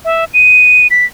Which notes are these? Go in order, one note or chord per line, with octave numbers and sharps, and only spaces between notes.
E5
D#7
B6